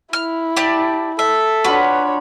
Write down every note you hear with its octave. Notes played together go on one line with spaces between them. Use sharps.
E4 F6
G4 D5 G5 A5
A4 E5
D4 F4 F#4 B4 C#5 B5